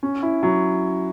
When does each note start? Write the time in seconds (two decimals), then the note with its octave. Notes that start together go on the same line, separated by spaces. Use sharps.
0.03 C#4
0.23 E4
0.43 F#3